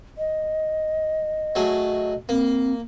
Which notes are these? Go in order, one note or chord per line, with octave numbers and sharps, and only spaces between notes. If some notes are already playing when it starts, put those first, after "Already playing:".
D#5
F#3 A3 G#4
A#3 C4